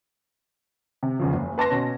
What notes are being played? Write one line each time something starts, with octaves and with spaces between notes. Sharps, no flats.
C3
E2 C#3 F3
F#1
B4 A5 C6 A#6
B2 C#4